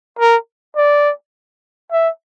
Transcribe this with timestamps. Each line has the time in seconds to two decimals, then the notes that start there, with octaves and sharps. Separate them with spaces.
0.19 A#4
0.76 D5
1.91 E5